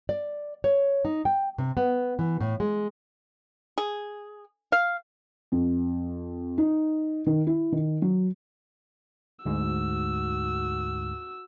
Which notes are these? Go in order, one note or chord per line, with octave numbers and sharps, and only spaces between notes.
D5
C#5
D#4
G5
C3
B3
E3
A2
G#3
G#4
F5
F2
D#4
D#3
E4
D#3
F#3
D2 G#2 F#4 E6